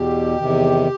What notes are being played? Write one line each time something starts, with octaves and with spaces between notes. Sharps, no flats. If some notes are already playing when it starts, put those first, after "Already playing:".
Already playing: E2 B2 G4
E2 C3 D#3